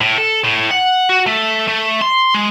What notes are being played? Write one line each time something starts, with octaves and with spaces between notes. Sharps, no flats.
A2
A4
A2
F#5
F#4
A3
A3
C6
G#3